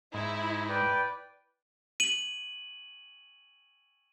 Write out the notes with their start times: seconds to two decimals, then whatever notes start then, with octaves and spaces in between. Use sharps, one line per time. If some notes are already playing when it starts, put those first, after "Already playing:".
0.14 G#2 E4
0.69 B4 D5 G5
2.00 D#7 F#7